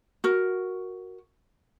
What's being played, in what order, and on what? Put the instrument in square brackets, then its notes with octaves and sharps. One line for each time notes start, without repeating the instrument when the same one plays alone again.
[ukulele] F#4 A#4